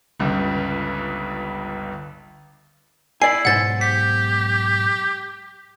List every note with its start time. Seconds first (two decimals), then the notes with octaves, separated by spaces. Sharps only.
0.20 G1 C#2 G2
3.22 E4 D5 G#5 C7
3.45 B1 G#2 C5 F#5 A6
3.81 G4 B6